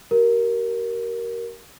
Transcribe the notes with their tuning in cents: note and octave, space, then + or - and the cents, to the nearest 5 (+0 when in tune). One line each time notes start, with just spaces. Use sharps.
G4 -40 A#4 +5